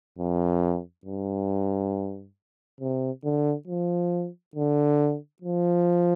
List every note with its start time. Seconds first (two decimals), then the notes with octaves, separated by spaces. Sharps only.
0.18 F2
1.05 G2
2.80 C3
3.24 D3
3.67 F3
4.55 D3
5.42 F3